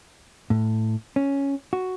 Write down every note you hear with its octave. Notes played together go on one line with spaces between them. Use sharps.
A2
C#4
F#4